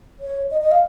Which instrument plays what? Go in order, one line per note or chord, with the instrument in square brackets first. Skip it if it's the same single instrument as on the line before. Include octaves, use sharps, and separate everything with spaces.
[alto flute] C#5
D#5
D#5
F5